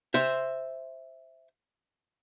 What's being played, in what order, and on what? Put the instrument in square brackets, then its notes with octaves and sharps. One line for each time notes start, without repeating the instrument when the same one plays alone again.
[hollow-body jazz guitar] C5 E5